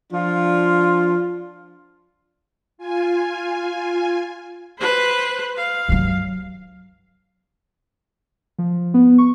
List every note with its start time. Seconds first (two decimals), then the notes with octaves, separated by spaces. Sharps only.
0.13 F3 D4 F4
2.78 F4 G#5
4.78 B4 C5
5.57 F5
5.89 G2 F#3
8.59 F3
8.94 B3
9.18 C#6